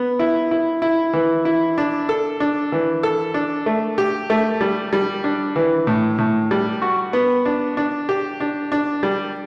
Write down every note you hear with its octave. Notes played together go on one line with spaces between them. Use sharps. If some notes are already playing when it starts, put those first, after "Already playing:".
Already playing: B3
E4
E4
E4
E3
E4
D4
A4
D4
E3
A4
D4
A3
G4
A3
G3
G3
D4
E3
A2
A2
G3
F#4
B3
D4
D4
G4
D4
D4
G3